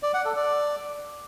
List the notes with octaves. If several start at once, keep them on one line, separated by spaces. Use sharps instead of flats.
D5
F#5
A4
D5